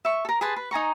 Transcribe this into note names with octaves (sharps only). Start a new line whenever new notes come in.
E5 C#6
A4 A#4
G#4 B4 A5 C6
B4
D#4 G#5 A#5 C#6